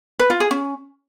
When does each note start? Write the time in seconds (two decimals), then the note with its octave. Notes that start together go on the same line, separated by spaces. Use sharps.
0.19 B4
0.30 F4
0.40 G#4
0.51 C#4